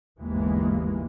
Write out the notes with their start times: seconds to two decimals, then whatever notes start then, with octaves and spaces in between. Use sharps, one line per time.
0.21 G1 D#2 G#2 E3 G#3 A#3